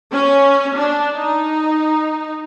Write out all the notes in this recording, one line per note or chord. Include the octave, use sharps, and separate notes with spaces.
C#4
D4
D#4